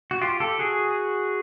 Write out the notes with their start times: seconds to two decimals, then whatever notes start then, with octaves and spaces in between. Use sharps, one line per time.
0.11 F#4
0.21 F4 G4
0.40 G4 A4
0.59 F#4 G#4